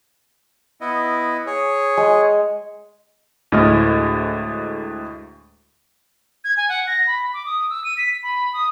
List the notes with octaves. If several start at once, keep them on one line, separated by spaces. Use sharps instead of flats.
B3 E4 D#5
G#4 C#5
G#3
D2 A2 G#3 D#5 F6
G#6
G#5
F#5
A#6
B5
D6
D#6
E6
D#7
B6
B5
D#6